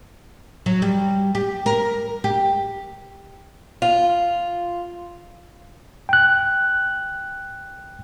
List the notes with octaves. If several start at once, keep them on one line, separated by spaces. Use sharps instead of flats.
F#3
G3
G4
A#4
G4
F4
G5 F#6